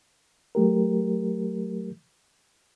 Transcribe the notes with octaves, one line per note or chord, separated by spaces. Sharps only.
F#3 A3 G4 A#4